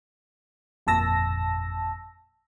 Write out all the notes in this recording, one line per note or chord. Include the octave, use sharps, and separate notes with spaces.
G1 F2 A#2 A5 E6 A#6